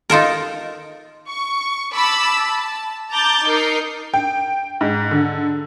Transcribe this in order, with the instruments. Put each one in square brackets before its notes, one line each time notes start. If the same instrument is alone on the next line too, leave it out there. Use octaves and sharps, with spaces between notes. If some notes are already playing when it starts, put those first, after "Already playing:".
[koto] D#4 F4 A4 A#4
[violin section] C#6
A5 B5 D6 E6
A5
A5 A#5 D6 G6 A6
D#4 A#4 C7
[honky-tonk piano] G5
G#2
D3